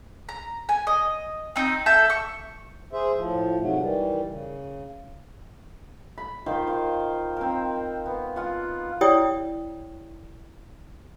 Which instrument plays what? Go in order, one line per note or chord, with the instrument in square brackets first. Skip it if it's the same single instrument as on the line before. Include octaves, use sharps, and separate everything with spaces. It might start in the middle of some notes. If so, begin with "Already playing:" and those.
[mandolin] A#5
G#5
D#5
C4 D#4
A4 E5 G6
C#6
[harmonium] G#4 C5 E5
A2 F3
G#2 C3 F#3 A3
D#3 E3 G3
C#3
[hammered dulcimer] B5
D#3 F4 C5 F5
C5 F5
C4 A#4
B3
F4 G#4 F#5
[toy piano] E4 G4 C#5 D5 G5 D#6